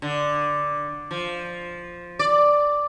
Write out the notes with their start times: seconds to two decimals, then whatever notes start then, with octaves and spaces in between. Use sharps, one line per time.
0.02 D3
1.11 F3
2.19 D5